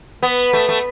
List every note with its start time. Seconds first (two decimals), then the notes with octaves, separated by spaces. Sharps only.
0.23 B3
0.53 A3
0.69 A3